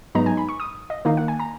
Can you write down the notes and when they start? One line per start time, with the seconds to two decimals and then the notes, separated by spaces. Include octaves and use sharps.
0.15 G#2 F#3 B3 D#4 A#5
0.26 G#5
0.37 B5
0.49 C#6
0.60 D#6
0.90 D#5
1.05 D#3 A#3 D#4 F5
1.17 F#5
1.28 G#5
1.40 A#5